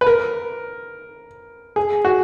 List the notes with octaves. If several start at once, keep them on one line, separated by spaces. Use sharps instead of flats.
B4
A#4
G#4
F#4